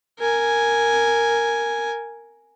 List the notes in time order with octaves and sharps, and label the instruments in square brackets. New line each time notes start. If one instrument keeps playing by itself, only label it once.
[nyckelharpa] A#4 G#5